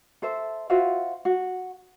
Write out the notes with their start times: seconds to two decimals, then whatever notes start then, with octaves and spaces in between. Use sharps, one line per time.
0.22 A4 C5 E5
0.70 F4 F#4 C5 E5
1.25 F#4